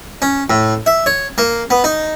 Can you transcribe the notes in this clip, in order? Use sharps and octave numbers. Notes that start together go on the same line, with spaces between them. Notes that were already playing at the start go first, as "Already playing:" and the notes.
C#4
A2
E5
C#5
A#3
B3
D#4